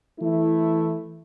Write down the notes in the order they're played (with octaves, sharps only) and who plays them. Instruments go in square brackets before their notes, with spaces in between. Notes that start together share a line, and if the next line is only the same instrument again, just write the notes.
[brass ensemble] E3 A3 E4